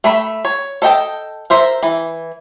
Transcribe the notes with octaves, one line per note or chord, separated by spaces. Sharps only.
A3 E5 B5
C#5
A4 D#5 G5 A5
A#4 C5 E5
E3